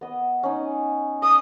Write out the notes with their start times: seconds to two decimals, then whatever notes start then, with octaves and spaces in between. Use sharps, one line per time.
0.01 B3 D#5
0.43 C#4 D#4
1.22 D#6 E6